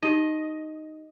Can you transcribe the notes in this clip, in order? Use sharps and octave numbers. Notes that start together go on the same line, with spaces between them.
D#4 G4 D#5